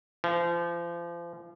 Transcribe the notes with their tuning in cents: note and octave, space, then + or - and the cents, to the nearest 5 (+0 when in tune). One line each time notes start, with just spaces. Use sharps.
F3 -35